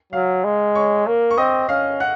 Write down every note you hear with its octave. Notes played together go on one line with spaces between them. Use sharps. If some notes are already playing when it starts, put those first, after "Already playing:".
F#3 F5 F6
G#3
C#5 C#6
A#3
C#6
C4 D#5 D#6
C#4 F5 F6
F#5 F#6